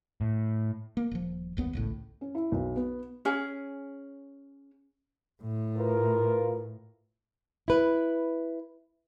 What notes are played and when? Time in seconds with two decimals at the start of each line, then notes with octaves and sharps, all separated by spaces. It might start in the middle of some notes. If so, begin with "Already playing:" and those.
0.21 A2
0.97 A#3
1.11 D#1 F3
1.57 G1 D#2 B3
1.73 G#1 C#2 A2
2.21 C#4
2.35 E4
2.52 B1
2.76 B3
3.25 C#4 G#4
5.42 A2
5.78 F4 A#4 B4
7.68 E4 B4